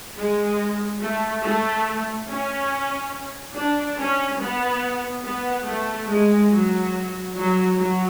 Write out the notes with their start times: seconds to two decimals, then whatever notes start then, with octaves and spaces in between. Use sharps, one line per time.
0.17 G#3
1.02 A3
1.44 A3
2.29 C#4
3.55 D4
3.99 C#4
4.40 B3
5.24 B3
5.67 A3
6.09 G#3
6.52 F#3
7.36 F#3
7.79 F#3